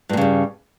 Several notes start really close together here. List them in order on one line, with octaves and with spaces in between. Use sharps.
G2 A#2 C#3 G3